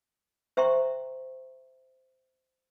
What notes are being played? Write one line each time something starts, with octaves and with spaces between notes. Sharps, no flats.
C5 E5 G5 A#5 C6 C#6